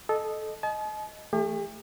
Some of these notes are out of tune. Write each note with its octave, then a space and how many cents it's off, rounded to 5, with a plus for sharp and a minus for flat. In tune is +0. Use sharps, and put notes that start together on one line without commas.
A4 -20 D#5 -20
D#5 +0 A5 -45
E3 +0 A3 +0 G4 +45